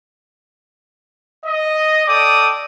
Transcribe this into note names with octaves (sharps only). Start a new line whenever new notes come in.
D#5
A4 D5 G5 D6 D#6